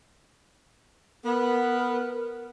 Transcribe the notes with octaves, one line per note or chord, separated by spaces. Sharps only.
B3 A#4